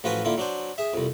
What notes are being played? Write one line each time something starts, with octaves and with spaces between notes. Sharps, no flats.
A1 F3 F4 F#4 B4 G#5
D3 A#3 E4 F4
F#3 D4 C5
G#4 E5
C2 F2